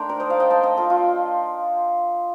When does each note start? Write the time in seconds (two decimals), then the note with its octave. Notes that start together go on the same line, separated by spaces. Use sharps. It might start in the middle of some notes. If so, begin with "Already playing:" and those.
Already playing: D#3 A3 D4 G5 A#5 C6
0.09 A#4 D5
0.20 C5 D#5
0.30 D5 F5
0.40 D#5 G5
0.50 F5 A5
0.63 D#5 G5
0.77 F4 A4
0.90 F4